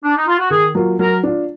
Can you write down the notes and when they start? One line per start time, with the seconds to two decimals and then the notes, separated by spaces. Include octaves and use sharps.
0.04 D4
0.16 D#4
0.27 F4
0.39 F#4
0.50 D#3 G#4
0.75 F#3 A#3 F4
0.99 F#3 A#4
1.23 D4 F4